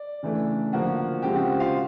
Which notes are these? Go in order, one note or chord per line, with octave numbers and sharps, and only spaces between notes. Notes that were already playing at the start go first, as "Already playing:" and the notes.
Already playing: D5
C#3 E3 A3 D4
D3 F3 A#3 F#4 F#5
C#3 F3 G#3 C4 G4 G5
F#4 F#5
F4 F5